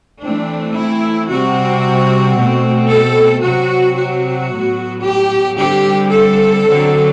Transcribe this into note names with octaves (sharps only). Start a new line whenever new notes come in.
E3 A3 C4 D4
E4
C3 G3 C4 F#4
B2 A3 C4
A4
C3 F#3 C4 F#4
F#4
A2 F#3 B3
G4
D3 G3 C4 G4
A4
D3 F#3 C4